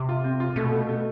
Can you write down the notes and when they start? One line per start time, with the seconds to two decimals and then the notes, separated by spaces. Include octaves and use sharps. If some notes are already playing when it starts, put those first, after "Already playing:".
Already playing: C3
0.09 F4
0.24 C4
0.40 F4
0.56 B2 A3
0.72 A3
0.89 A3